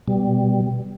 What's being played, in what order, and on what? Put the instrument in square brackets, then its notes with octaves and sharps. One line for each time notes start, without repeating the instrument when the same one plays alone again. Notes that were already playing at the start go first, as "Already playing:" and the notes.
[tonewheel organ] B2 G3